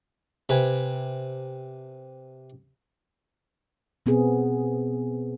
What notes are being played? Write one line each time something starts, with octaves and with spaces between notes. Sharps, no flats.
C3 B4 G#5
B2 B3 C4 G#4